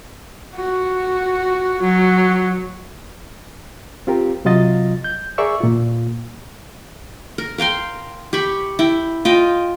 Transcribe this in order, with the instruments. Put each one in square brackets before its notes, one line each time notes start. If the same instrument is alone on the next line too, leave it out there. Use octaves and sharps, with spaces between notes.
[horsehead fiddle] F#4
F#3
[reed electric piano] C4 F4 G4 A#4
C3 F#3 F4 D#5 A6
G6
G#4 A#4 D5 E5 C#6 E6
A#2 F4
[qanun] A#4
A#4 F5 G5 C6
G4 B5 C#6
E4 G5
F4 D#5 G5